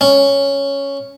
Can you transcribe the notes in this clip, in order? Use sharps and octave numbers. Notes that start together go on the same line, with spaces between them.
C#4